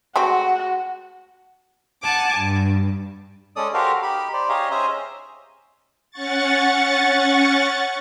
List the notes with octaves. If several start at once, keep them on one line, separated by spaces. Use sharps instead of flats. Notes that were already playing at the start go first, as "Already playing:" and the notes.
G#3 A3 C4 F#4 F#5
F#5 G#5 A5 D6
G2
G#3 C#4 A4 D5 D#6
F#4 G4 A4 A#4 C5 F5
D#4 G4 B5
C5 D5
D#4 G4 G#4 C#5 D#5 F5
C#4 G#4 C5 D#5 E5 A#5
C#4 F#5 C#6 A6